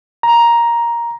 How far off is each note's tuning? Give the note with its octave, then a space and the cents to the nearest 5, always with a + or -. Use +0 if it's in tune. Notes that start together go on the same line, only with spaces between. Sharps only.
A#5 +10